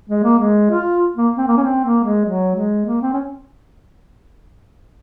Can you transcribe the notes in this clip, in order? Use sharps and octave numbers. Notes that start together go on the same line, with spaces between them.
G#3
A#3
G#3
F4
A#3
C4
A#3
C#4
C4
A#3
G#3
F#3
G#3
A#3
C4
C#4